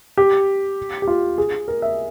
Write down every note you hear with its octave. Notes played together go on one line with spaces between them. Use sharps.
G4
G4
F4
G#4
A#4
E5